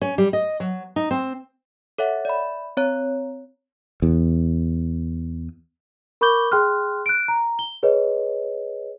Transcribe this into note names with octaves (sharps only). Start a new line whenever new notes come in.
C#4
G3
D#5
F#3
D#4
C4
A4 C#5 E5 F#5
D5 E5 B5
C4 C#5 A#5 F#6
E2
A#4 B5 C#6 D6 G6 G7
G#4 G5 C6 F6 F#6
F#6 D7
A#5
G7
G#4 B4 C#5 D#5